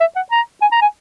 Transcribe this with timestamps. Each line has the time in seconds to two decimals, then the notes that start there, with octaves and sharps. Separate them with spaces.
0.01 E5
0.16 F#5
0.31 A#5
0.62 G#5
0.72 A#5
0.82 G#5